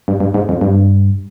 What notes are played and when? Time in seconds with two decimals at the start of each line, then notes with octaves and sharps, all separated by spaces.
0.08 G2
0.20 G2
0.34 G#2
0.49 F2
0.61 G2